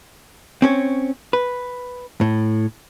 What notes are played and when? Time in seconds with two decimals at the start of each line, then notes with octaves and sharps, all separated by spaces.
0.62 C4 C#4 C#5
1.33 B4
2.21 A2